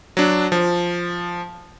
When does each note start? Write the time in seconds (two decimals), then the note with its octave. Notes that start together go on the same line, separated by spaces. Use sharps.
0.17 F#3 D4
0.52 F3